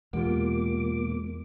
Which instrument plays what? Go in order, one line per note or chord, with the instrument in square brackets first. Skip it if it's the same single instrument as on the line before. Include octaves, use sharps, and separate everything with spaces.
[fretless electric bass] E2 [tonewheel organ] B2 A#3 D6 [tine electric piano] G#3 [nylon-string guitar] F4 G4 F#5